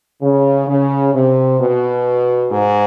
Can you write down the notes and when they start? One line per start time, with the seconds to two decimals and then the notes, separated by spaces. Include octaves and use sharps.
0.22 C#3
0.68 C#3
1.14 C3
1.60 B2
2.51 G#2